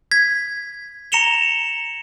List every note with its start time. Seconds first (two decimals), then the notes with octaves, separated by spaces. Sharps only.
0.11 G#6 B6
1.12 A#5 A#6 C#7 E7 F7 G7